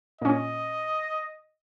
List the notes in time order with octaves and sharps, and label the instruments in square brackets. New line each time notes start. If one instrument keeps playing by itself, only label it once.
[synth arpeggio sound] A#2 C#4 [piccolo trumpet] D#5